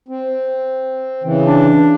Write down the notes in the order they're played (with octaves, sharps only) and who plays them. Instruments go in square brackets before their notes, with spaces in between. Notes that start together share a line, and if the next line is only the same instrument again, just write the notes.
[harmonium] C4
C#3 E3
[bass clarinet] D4